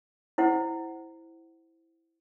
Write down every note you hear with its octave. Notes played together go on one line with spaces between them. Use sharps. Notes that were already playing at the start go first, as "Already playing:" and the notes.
E4 C5 F#5